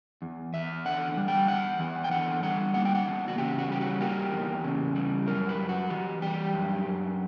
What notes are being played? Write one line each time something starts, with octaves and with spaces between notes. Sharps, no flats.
E2
E2 E5
D3 F#5
G3
G5
E2 F#5
E2
G5
D3 F#5
G3 F#5
A#3 F#5
G5
F#5
E2
F#4
C#3 G4
F#4
G3 G4
F#4
A#3 G4
E2
C#3
G3
F#2 A#4
B4
F#2
F#4
E3 G4
G3 G4
F#2
F#2